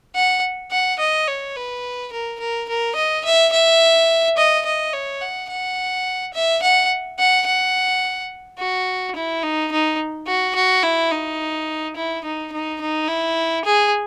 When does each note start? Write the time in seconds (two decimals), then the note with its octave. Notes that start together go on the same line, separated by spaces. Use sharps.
0.15 F#5
0.71 F#5
0.99 D#5
1.27 C#5
1.56 B4
2.12 A#4
2.39 A#4
2.69 A#4
2.96 D#5
3.24 E5
3.52 E5
4.37 D#5
4.65 D#5
4.93 C#5
5.21 F#5
5.49 F#5
6.34 E5
6.62 F#5
7.19 F#5
7.46 F#5
8.59 F#4
9.15 E4
9.42 D#4
9.71 D#4
10.27 F#4
10.55 F#4
10.83 E4
11.11 D#4
11.96 E4
12.24 D#4
12.52 D#4
12.81 D#4
13.08 E4
13.64 G#4